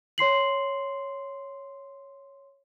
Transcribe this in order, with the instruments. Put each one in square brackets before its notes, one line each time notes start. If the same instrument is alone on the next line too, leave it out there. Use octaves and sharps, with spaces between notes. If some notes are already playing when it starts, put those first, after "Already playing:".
[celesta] C#5 C6 C7 F#7